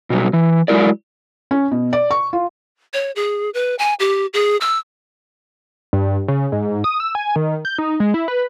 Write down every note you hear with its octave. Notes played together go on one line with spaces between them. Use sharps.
B2 F#3 G3
E3
F#3 G#3 E4 F#4 A#4 D5
C#4
B2
D5
C#6
F4
C#5
G#4
B4
G#5
G4
G#4
E6
G2
C#3
G#2
D#6
E6
G#5
D#3
G6
D#4
G#3
E4
B4